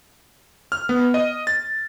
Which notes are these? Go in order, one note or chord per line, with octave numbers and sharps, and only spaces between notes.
F6
B3
D#5
A6